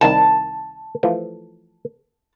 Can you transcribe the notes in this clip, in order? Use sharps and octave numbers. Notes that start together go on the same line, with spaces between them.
C2 D#3 G5 A5
E3 F3 A3